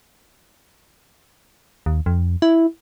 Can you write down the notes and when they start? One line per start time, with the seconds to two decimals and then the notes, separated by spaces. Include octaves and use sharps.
1.86 D#2
2.06 F2
2.42 E4